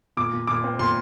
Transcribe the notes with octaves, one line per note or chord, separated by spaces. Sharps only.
A#2 D6
A#2
A#2 D6
C4
A#2 C6